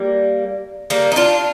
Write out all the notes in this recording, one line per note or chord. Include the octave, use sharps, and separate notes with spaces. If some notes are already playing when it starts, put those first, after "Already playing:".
Already playing: G3 A#3
G3 A#3
D#4
D4 F4